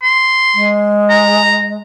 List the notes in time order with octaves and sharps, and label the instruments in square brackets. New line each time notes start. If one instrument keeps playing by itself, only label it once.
[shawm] C6
[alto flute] G#3
[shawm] A#5